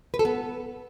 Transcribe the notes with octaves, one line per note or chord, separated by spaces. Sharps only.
B4
A4
B3